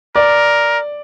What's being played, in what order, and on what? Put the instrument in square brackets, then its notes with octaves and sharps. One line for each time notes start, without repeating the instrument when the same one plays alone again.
[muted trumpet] A#4 [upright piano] D5